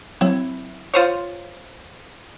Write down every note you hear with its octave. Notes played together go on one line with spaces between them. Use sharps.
F#3 C4 E4
F4 C5 C#5